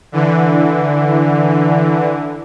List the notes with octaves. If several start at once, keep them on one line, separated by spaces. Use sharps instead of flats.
D3 E3